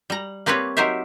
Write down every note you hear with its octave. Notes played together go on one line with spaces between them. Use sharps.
G3 A#5
A#3 C4 G4 B4 C#5
F#3 D#4 G4 A#4 C5 E5